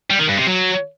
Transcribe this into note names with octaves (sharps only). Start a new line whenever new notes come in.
G3
D#3
G2
C3
F#3